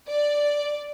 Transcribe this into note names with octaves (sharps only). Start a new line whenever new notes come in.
D5